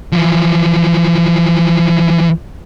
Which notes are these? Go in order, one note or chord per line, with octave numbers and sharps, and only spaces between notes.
E3 F3